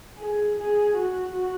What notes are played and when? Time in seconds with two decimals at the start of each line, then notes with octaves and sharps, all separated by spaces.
0.18 G#4
0.59 G#4
1.01 F#4